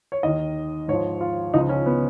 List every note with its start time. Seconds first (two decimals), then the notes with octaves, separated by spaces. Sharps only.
0.12 C#5
0.23 D#2 D#3 D#5
0.88 G#2 F3 C#5
1.21 F4
1.54 C#2 C#3 F3 D#4
1.69 C#4
1.86 B3